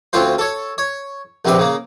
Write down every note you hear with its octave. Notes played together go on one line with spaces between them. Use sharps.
D2 C4 C#4 F4 C5
A4 C#5
C#5
A#1 C3 C4 B4 D5
C#3 A#3